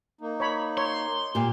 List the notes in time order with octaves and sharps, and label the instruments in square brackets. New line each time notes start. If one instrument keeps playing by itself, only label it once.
[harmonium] A#3 D#4
[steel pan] C#5 B5
[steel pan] C#5 [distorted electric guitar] C6
[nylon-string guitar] A#2 G4